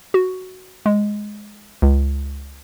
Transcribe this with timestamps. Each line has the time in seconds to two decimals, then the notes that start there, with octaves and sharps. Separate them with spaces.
0.14 F#4
0.86 G#3
1.82 C#2